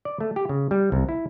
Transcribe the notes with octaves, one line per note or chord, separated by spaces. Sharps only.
D5
A3
G4
C#3
G3
C2
E4